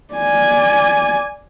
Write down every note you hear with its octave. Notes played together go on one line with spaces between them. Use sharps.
D5 G#5